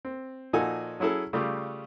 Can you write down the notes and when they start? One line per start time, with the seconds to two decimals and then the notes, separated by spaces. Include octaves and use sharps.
0.05 C4
0.53 A#2 F3 D#4 F#4 A4 G#5
1.00 F#3 C#4 E4 G#4 A4
1.33 C#3 G3 A3 F4 G4